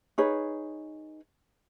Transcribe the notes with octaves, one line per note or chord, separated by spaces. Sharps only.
D#4 G#4 B4 C#5